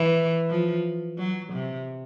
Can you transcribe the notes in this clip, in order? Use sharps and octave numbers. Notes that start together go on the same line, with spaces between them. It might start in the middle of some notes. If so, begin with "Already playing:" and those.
Already playing: E3
F3
F#3
C3